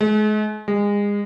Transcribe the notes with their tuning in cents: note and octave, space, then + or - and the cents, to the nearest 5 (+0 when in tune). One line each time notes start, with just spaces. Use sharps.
G#3 +40
G#3 -30